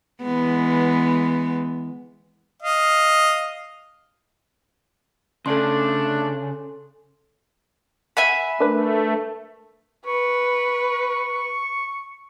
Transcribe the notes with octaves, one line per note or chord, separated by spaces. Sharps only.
E3 G#3 B3
D#5 F5
C#3 A3 D4 A4 C6
E5 F#5 G#5 B5
A3 D4 A#4 B4
B4 C#6